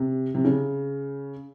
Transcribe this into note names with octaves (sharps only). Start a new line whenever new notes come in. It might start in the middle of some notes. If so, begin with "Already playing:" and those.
Already playing: C3
C3
C#3